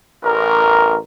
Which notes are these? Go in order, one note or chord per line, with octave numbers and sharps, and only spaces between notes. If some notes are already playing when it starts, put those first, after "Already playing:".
A1 A#4